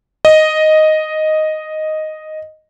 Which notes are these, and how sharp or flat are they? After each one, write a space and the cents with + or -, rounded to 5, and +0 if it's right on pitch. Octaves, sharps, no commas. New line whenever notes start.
D#5 +0